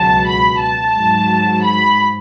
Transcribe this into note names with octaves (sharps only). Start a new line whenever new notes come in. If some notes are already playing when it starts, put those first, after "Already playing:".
Already playing: C#2 B2 F#3 A5
B5
A5
G#2 F#3
B5